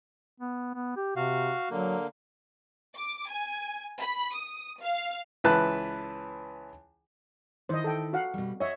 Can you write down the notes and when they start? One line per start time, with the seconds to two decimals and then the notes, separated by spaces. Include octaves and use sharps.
0.40 B3
0.74 B3
0.97 G4
1.16 C3 F#4 F5
1.71 D3 F#3 A#3
2.96 D6
3.31 G#5
4.00 B5
4.35 D#6
4.82 F5
5.44 C#2 E3 B4 A5 F#6
7.69 D#3 E4 C5 D#5
7.84 A4 G5
8.13 F#4 F5 F#5
8.34 B2 G3
8.60 C#5 D#5 E5 F#5